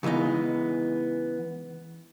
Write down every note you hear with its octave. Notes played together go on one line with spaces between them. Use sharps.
C#3 E3 G#3 B3 D#4